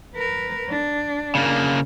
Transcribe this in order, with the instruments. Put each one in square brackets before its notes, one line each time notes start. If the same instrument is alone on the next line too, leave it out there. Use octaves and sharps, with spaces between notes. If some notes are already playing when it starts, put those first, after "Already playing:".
[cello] A#4 B4
D4
[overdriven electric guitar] C#3 A#3